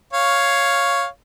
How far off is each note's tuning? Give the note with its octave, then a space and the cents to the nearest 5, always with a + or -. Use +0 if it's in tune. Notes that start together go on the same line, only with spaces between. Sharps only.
C#5 +0 F5 +0